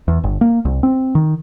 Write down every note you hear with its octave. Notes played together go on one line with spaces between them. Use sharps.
E2
G1
A#3
C2
C4
D#3